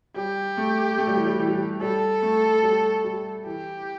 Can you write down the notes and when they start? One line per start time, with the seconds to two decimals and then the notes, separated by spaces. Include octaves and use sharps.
0.16 G3 G4
0.57 A3
0.98 A3
1.07 G3
1.17 E3
1.26 G3
1.40 E3
1.48 G3
1.55 E3
1.81 G3 A4
2.23 A3
2.63 G3
3.04 G3
3.46 E3 G4